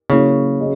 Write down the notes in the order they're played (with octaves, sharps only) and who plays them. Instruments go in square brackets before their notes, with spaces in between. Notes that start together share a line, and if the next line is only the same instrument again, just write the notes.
[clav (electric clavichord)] C#3 [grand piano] F#3 A#3 E4
[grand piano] F#3 C#4 G#4 D#5